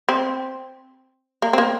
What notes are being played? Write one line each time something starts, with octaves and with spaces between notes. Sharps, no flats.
C4
A#3
C4
A#3